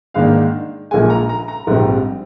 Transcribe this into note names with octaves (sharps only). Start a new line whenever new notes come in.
G#2 D#3 A#3 D4 F5
A#1 A#2 G#3 G#5
A#5
A#5
A#5
A#1 G#2 G3 C4